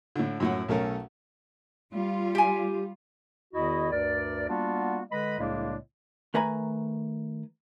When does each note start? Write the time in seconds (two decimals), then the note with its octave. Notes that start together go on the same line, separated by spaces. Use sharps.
0.16 A2 D3
0.40 F#2 A2 F#5
0.69 B1 A3 C#4 A4 A#4
1.94 G3 F4
2.35 G4 G#5
3.53 E2 D#3 E4 F#4 D#5
3.91 D2 G2 A#4 D5
4.48 G3 A#3 B3 D4 F4 F#4
5.11 D3 G#3 B4 D#5 B5
5.38 C2 A2 C#3 G#3 A#3 D4
6.34 D#3 A3 B4 G#5 A#5 B5